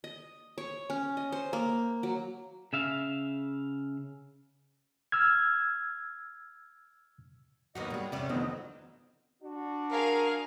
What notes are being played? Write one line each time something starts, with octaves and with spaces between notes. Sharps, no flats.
D#5
C#5
C#4
D#5
C5
A#3
F#3
C#3 E5 F5
E6 F6 G#6
D#2 F#3 A#3 B3 D#4 F#4 D#5
B2 G3 G#3
E2 C3 C#4 D5
F2 D3 D#3 F#3 A3 B3 C4 D#5
D4 F#4
G#4 A#4 F5